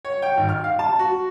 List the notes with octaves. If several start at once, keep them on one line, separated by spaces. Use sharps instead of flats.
C#5
G5
G#1
F6
F5
A5
F#4